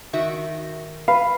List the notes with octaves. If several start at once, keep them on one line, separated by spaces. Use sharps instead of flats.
D#3 F#4 E5
B4 F5